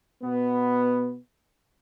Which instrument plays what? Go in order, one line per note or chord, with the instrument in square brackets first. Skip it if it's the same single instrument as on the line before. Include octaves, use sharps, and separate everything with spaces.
[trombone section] B2 B3